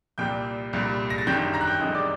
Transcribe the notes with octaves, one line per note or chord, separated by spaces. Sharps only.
C2 A#2 G3 G5 G6
C2 A#2 G3
A#6
A6
G1 F#2 D#3 G3 G5 G6
A#5 A#6
F#6
G5 G6
G1 F#2 D#3 G3 D#5 D#6
D5 D6